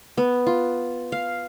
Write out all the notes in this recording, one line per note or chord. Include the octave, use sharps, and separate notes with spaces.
B3
F4
F5